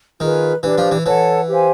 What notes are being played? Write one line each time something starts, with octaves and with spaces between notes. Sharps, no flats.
D#3 F4 G#4 B4
E3 D4 G4 B4
F3
E3
E3 A4 C#5 F#5 A5
G4 C5 F5 G#5